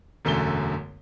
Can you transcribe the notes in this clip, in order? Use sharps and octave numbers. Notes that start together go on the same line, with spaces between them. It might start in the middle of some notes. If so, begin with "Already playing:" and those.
E1 F#2 D3 A3 A4 G7